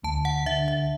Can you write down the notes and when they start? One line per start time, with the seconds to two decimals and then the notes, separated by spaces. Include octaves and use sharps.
0.04 D2 A5
0.25 F#5
0.46 D3 E5
0.68 E5